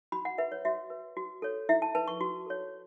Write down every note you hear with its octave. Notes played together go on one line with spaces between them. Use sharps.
F#4 B5
F#5
B4 E5
C#5
F#4 E5
B4
F#4
A4 C#5
E4 E5
A5
B4 A5
C#6
F#4
A4 C#5